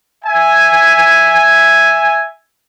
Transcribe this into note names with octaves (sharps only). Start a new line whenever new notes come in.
E5 G#5